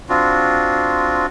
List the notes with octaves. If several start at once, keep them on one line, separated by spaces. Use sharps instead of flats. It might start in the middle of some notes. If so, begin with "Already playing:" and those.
C4 D4 F4 F#4